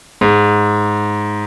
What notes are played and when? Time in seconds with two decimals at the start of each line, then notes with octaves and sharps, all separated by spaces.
0.21 G#2